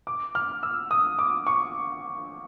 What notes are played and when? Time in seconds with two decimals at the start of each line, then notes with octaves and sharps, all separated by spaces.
0.07 D6
0.35 F6
0.63 E6
0.91 D#6
1.19 D6
1.47 C#6